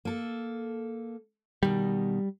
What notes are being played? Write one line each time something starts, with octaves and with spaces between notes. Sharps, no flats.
A#3 A4
B2 D#3 G3